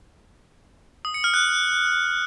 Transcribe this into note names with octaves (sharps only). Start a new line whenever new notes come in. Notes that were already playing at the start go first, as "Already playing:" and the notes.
D#6
C#7
F6
F#6